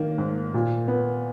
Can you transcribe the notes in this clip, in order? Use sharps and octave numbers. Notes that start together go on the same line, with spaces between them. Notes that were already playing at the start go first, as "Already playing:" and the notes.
Already playing: D#3 A#3
G#2
A#2
B3